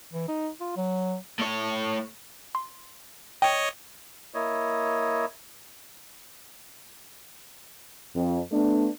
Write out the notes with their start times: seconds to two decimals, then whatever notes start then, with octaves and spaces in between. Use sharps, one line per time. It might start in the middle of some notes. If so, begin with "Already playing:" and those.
0.14 E3
0.29 D#4
0.61 F4
0.77 F#3
1.40 A2 C#5
2.55 C6
3.42 C#5 D#5 G5
4.34 A#3 E4 C#5 D#5
8.15 F2
8.52 A3 B3 D4